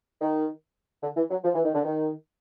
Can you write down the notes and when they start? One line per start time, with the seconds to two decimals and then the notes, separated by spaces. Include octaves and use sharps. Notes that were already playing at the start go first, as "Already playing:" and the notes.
0.21 D#3
1.03 D3
1.17 E3
1.30 F#3
1.44 F3
1.54 E3
1.64 D#3
1.74 D3
1.84 D#3